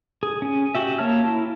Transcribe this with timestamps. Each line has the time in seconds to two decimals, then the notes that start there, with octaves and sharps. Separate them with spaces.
0.23 G#4
0.42 C#4 G#5
0.75 F#4 G4 E5
0.98 A#3 C#5 A5 F6
1.24 E4